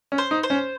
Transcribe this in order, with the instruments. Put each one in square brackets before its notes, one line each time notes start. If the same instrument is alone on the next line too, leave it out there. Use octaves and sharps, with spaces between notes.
[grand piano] C#4
[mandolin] C5
[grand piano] D#4
[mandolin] C5
[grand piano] C#4